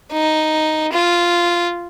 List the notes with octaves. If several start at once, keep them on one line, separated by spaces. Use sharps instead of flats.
D#4
F4